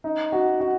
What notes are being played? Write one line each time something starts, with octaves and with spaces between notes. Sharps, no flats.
D#4
F#4
F#4